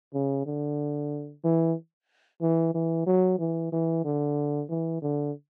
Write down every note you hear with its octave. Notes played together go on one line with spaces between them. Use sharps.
C#3
D3
E3
E3
E3
F#3
E3
E3
D3
E3
D3